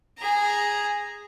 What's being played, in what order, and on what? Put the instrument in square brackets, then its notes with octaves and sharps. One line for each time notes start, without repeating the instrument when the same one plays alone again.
[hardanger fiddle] G#4 A#5